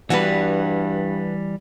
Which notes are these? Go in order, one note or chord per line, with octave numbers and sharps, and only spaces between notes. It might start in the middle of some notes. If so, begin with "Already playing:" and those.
G2 E3 G3 B3 D4 F#4 B4 F#5